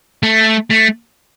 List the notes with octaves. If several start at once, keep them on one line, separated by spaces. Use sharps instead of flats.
A3
A3